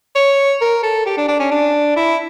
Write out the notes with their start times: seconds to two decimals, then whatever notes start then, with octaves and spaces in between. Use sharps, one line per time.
0.16 C#5
0.61 A#4
0.83 A4
1.06 G4
1.17 D4
1.28 D4
1.40 C#4
1.51 D4
1.96 E4